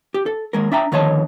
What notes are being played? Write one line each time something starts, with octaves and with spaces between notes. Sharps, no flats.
G4
A4
D#2 G#3 A#4
D4 E5 G5 A#5
F2 D3 D#3 C#5 D#5 A5